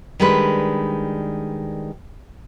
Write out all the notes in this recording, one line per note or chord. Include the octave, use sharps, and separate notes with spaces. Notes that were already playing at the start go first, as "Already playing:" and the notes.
D#3 G3 G#3 D4 B4